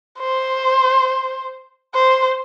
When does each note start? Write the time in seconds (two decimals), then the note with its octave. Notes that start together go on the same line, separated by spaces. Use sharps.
0.19 C5
1.95 C5